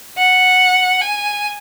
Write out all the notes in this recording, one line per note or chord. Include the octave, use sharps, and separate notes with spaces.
F#5
G#5